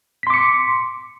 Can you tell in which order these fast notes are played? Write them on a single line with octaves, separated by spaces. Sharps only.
B6 C6 D6 C#7